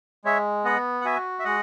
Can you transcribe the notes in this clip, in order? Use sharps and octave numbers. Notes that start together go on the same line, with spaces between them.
G#3 C#5 E5
B3 D#5 F#5
F#5
F#4 E5 G#5
E5
G#3 D#5 F#5